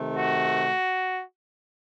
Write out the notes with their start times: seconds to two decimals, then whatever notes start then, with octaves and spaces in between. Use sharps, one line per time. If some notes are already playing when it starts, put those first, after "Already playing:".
Already playing: C3 D#3 A3
0.17 F#4